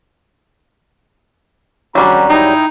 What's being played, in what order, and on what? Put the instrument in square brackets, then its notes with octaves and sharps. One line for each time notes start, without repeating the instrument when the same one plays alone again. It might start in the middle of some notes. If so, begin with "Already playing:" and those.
[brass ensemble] G#1 A#5 [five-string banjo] F#3 G3 D4 [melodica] C#4 F#4 G4
[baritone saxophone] D#4 [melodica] E4 D#5 G5